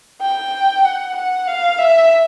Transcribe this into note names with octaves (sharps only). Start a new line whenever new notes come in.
G5
F#5
F#5
F5
E5